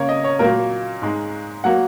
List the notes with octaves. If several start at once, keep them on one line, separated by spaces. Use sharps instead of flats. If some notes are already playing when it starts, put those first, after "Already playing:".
Already playing: C#3 A#3 A#4 C#5
D#5
C#5
A#2 F#3 A#3 A#4
G#2 G#3
F#3 A#3 F#5